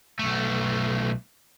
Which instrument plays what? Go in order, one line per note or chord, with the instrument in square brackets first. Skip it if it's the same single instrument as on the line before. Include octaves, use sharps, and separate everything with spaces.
[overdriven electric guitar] B1 A3